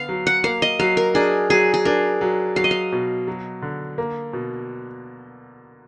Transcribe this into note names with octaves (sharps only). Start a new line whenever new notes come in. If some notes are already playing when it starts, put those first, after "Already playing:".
Already playing: D3 B3 F5
F#3
F#5
A#3 F5
D#5
F#3 F5
A#4
D4 G#4
F#3 G#4
G#4
D4 A#4
F#3
F#3 F5
D#5
F5
B2
F#3
D3
A#3
B2